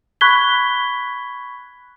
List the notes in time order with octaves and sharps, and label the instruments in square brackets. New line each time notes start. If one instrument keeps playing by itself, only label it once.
[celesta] B5 C#6 F#6 G#6 B6 G7